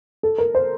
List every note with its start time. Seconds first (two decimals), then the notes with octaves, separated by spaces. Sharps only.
0.23 A4
0.38 A#4
0.55 C5